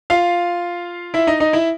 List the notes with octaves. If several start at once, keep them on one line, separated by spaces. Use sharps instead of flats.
F4 F5
E4 E5
D#4 D#5
D#4 D#5
E4 E5